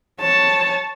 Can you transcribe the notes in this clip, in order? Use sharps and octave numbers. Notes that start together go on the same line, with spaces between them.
C#5 A5